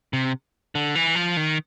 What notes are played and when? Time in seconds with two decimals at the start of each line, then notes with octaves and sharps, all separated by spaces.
0.13 C3
0.75 D3
0.95 E3
1.15 F3
1.37 D#3